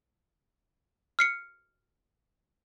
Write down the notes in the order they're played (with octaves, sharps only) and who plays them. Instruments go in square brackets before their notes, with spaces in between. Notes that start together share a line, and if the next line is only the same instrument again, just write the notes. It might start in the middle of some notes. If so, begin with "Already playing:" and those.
[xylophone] F6 C7 C#7